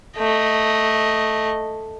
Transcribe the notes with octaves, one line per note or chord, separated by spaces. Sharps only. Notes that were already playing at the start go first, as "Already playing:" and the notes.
A3 D#5